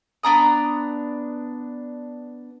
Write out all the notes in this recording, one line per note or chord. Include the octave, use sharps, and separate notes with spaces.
B3 D4 A#5 D#6